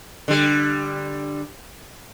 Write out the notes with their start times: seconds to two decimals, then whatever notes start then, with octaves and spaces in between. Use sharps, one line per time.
0.28 D3 G3